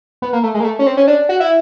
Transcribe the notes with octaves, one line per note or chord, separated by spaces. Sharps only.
B3
A#3
A3
G#3
A#3
A3
C#4
C4
C#4
D4
F#4
E4